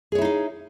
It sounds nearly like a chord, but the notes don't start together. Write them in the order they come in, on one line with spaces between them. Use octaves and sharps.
G#4 C#5 E4 D#4 F5